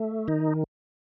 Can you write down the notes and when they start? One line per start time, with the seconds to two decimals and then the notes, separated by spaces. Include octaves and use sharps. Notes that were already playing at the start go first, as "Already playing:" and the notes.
Already playing: A3
0.28 D#3 D#4